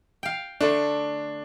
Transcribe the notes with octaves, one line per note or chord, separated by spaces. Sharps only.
F5 G5
D3 A3 D4